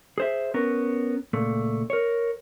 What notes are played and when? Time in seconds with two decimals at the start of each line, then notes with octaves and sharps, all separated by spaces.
0.18 G#4 C5 E5
0.54 B3 C#4 A#4
1.33 C#2 A#2 A3
1.90 A#4 C#5